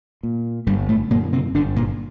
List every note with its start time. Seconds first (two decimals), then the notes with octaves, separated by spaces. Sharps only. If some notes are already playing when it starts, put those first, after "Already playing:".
0.23 A#2
0.67 G1 G2 G3
0.89 A2 A3
1.11 F#2 A#2 D3 A#3
1.33 C3 C4
1.54 G1 D3 D4
1.76 A#2 A#3